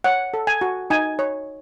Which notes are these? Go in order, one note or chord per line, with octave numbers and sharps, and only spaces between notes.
C#5 F#5
A4
G#5
F#4
D#4 G#5
C#5